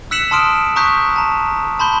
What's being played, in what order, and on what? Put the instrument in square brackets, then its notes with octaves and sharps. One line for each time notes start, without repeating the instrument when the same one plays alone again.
[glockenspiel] E6 F#6 B6 C#7 E7 F#7
A5 C6 D#6 F6 D7
A#5 C#6 D#6 F#6 G6 B6
A5 A#5
A5 B5 C6 G6 G7